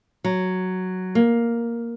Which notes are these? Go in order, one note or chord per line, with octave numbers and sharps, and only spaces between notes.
F#3
A#3